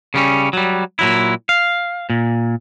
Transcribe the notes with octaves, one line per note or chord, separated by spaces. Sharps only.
C#3 G3 C#4
F#3 G3
A#2 F#3 E4
F5
A#2